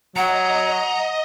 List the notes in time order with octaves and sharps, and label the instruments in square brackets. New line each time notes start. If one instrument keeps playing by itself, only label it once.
[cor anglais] F#3 [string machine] D#5 [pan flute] F#5 [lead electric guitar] A#5